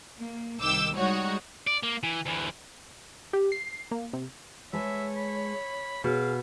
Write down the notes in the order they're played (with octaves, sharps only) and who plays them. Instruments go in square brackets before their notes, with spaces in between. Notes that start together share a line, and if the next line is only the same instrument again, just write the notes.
[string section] A#3
C2 D#3 D6 E6 G6
G3 G#3 D#4 F#4 C#5 F#5
[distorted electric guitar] D5
A#3
E3
D2 E3
[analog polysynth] G4
C7
A#3
C3
[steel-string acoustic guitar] G#3 A4 B4 [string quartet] C#5 [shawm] E5
[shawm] B5
[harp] B2 [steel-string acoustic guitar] G#4 [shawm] F5